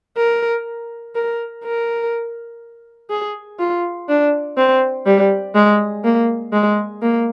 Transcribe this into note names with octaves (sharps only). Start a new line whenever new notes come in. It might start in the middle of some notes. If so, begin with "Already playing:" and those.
A#4
A#4
A#4
G#4
F4
D4
C4
G3
G#3
A#3
G#3
A#3